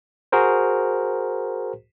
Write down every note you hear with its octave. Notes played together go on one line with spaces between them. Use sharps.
F#4 G#4 A#4 C5